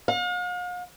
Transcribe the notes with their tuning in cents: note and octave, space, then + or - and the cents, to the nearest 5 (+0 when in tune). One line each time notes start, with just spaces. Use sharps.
F5 +45